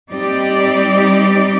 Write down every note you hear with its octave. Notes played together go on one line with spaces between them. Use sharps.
G3 C4 D#4 G4 D5